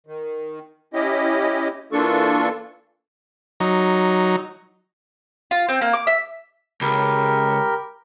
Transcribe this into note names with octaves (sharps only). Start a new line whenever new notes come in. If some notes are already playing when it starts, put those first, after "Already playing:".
D#3
C#4 E4 G4 D#5
E3 A#3 D4 F4 A4 C#6
F#3 D#4
F4
C4
A#3
D6
E5
C#2 G4 A#4 B5